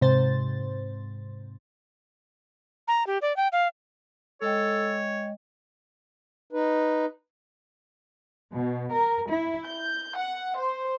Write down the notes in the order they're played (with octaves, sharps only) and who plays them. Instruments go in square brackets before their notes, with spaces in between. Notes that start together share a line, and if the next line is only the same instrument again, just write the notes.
[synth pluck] G#2 C3 C5 A6
[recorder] A#5
G4
D5
G5
F5
[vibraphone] G#3 D#5 G5 [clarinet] A4 [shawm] C#5
[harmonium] D#4 B4
[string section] B2
A#4
E4
G6
F#5
C5